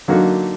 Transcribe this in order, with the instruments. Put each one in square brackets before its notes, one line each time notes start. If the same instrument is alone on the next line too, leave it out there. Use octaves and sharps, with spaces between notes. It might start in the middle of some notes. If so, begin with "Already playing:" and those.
[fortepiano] D3 F#3 A#3 D#4 F#4